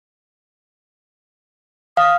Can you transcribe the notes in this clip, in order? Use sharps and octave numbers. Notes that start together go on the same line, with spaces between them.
F5 D#6